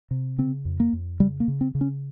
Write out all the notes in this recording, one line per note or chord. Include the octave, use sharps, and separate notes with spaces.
C3
C#3 C4
F2
A#3
F2
C#3 G3
A#3
C#3
C4
C#3
C#4